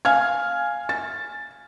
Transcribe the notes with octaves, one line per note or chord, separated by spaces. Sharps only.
F5 G#5 F6 G#6
A6